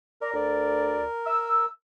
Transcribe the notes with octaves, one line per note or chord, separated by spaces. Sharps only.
A#4 D5 A#5
D2 D5
E6